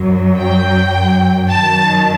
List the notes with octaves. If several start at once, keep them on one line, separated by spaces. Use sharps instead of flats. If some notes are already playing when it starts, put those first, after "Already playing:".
Already playing: F#2 F#3
G5
F#2 D#3 F#3 A5